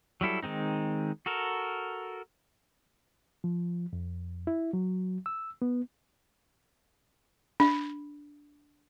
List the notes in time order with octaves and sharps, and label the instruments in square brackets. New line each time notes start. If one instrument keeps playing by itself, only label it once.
[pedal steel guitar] F#3 G3 E4 A4
D#3 G#3 C4 D#4
F#4 A4 A#4
[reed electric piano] F3
F2
E4
F#3
E6
B3
[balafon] D4